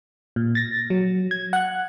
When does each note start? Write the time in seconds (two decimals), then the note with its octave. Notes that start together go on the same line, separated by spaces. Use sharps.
0.36 A#2
0.55 A6 A#6
0.90 F#3
1.31 G#6
1.53 F#5 F#6